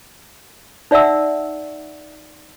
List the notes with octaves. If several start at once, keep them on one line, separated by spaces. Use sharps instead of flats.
D#4 D5 E5 F#5 E6